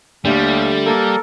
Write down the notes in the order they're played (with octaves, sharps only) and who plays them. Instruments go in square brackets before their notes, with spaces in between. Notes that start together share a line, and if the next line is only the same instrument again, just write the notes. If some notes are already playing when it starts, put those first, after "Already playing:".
[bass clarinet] D#2 [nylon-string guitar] D3 A3 [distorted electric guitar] G3
[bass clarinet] A#3 [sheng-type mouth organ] A4 A#4